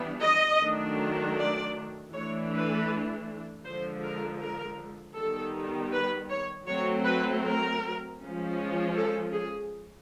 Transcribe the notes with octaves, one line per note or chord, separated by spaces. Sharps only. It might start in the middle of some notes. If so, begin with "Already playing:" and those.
Already playing: E3 G3 B3 D4
D#5
D#3 F#3 A3 D4
D5
E3 A3 D4 C#5
B4
D3 F3 G#3 C5
A#4
A#4
D#3 G3 B3 A4
B4
C#5
F#3 A3 C4 C#5
B4
A#4
F3 G#3 C#4
A4
G#4